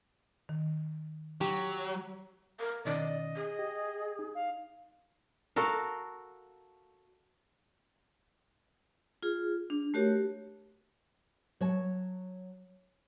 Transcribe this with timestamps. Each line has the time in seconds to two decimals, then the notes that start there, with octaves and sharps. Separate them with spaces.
0.49 D#3
1.41 F#3 G4
2.60 A#4
2.85 B2 D#3 C#4 D5 D#5
3.36 G#4
3.59 G4
4.19 D#4
4.35 F5
5.56 F#4 A4 A#4 F5
9.23 F4 G#4
9.70 D4
9.94 A3 F#4 G4 A#4 C#5
11.61 F#3 C#5 A5